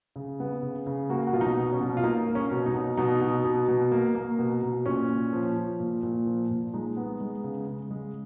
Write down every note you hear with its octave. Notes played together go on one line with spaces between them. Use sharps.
C#3
B3
C#3
C#3
A#3 F#4
F#4
B2 F4
D#4
B2
C#4
B2
F4
A#3 D#4
A#3
C#4
B2
D#4
B2
B2 D#4
B2
B2
B2
A#3
A#3
B2
B2
A#2 C#4
A#2
F3
F3
A#2
A#2
F3
A#2
G#3 D#4
B3
G#3
C#3
C#3
G#3